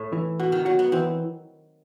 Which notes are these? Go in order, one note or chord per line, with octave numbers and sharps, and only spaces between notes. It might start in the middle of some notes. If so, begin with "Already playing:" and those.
Already playing: A2
E3
B2 F#4
D#3
F#3 F#4
B3
E3 C4